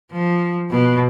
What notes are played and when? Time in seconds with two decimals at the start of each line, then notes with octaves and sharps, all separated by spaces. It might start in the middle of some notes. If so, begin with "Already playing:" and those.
0.13 F3
0.71 B2